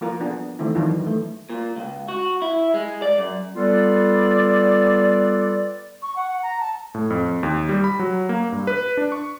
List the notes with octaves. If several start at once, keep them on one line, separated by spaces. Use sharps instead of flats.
F3 A#3 F4 A#4
B3 D4 F4 G#4
D#3 E3 A3 C4 E4
D#3 E3 F#3 D4 F4
A3
A#2
C#2
F#4
E4
G#3
D5
F#2
G3 B3 F4 A4 B4 D5
C#6
F#5
F#5
A#5
A5
A2
F2
D#2
G3
B5
F#3
A#3
G2
B4
D4
C#6